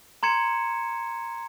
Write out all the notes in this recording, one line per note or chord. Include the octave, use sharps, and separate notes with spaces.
A#5 C6 G#6 C#7 E7